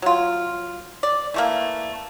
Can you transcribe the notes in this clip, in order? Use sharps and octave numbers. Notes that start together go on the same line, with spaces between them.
F#3 F4
D5
E3 A3 A#3